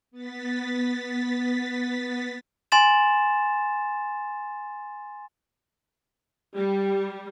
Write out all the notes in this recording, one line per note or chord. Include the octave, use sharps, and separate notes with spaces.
B3 A6 B6
G#5 C6 A6 E7
G3 G4